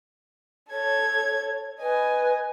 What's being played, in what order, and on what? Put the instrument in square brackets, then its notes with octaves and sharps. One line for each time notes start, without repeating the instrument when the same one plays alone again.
[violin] A4 G#6 [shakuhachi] C#5
[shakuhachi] B4 [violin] D#5 G#5